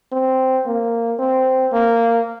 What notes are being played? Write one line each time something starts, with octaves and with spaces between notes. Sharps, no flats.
C4
A#3
C4
A#3